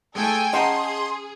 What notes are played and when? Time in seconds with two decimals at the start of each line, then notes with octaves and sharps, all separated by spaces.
0.15 G#3 A3 A4 G5 G#5
0.53 C#4 G#4 D#5 F#5 A5 A#5 C6